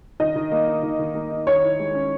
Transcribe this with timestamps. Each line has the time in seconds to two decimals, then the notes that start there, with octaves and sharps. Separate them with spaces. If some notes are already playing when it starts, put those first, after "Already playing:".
0.20 D#3 D#5
0.36 D#3
0.52 A#3
0.68 D#4
0.83 D#3
0.99 D#3
1.15 A#3
1.31 D#4
1.47 D#3 C#5
1.63 E4
1.79 G#3
1.94 C#4